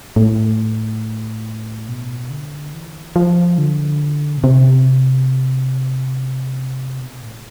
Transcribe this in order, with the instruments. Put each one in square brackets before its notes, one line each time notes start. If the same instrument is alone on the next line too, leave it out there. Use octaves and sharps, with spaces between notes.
[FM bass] A2
B2
D3
E3
F3
D3
B2
C3
B2
A2